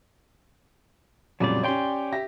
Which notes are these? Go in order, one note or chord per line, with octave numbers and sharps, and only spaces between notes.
F2 A#2 C#3 F#3 G3 D5
C#4 G4 C#5 D5 G5 C6
G4 E5 A#6